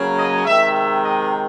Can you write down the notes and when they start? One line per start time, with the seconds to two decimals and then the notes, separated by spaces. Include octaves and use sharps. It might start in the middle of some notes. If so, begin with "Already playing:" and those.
Already playing: C#3 F#3 A#3 C#4
0.17 D#5
0.45 C3 D#3 G#3 E5
0.74 E5
1.03 D#5